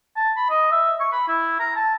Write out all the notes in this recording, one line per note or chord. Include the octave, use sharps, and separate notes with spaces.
A5
B5
D#5
E5
C#6
B5
E4
A#5
A5